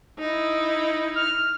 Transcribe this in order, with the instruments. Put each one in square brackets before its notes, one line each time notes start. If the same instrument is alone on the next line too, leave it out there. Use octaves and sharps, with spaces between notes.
[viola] D#4 E4
[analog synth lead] F6